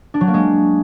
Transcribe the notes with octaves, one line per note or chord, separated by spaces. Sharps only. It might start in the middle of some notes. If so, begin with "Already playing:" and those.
D4
F#3
A#3
G#3